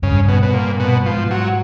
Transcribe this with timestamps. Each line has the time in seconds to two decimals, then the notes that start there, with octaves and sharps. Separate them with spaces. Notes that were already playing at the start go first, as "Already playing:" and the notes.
0.02 G2 C#3
0.28 B2
0.43 B2
0.54 A#2
0.80 B2
1.05 G#2 F3
1.31 F#3